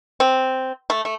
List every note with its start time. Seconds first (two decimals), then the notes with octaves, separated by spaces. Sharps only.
0.20 C4
0.90 A3
1.05 A3